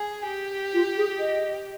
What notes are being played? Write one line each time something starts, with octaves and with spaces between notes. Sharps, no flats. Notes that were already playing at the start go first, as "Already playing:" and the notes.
Already playing: G#4
G4
F4
G#4
D#5